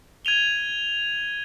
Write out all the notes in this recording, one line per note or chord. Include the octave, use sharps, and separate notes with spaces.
G#6 D#7 F7 G7